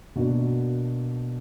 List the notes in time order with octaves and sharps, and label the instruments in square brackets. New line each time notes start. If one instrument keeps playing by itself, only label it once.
[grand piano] B2 A#3 D4 F#4